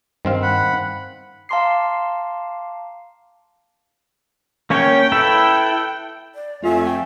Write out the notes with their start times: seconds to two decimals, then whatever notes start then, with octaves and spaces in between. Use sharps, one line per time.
0.25 G2 D#3 C4 F5
0.42 F#5 B5
1.49 F5 A5 A#5 C6 D6 C7
4.70 A#3 C#4 C#5 G5
5.12 E4 A4 B4
6.35 D5
6.64 F2 A3 F4 G#5
6.87 G5